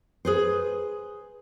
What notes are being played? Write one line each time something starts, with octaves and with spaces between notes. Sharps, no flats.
G#4 B4 C5